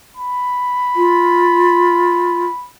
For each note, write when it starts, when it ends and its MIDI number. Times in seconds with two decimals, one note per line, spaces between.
0.17 2.68 83
0.96 2.45 65